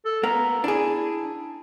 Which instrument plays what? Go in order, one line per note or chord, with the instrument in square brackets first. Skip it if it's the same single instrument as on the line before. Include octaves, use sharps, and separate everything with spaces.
[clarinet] A4
[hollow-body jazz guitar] A#3 B3 [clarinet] A#5
[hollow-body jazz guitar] D4 G#4 [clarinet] E4